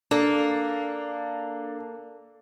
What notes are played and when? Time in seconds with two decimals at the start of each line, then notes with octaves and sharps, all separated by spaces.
0.11 A#3 D4 A4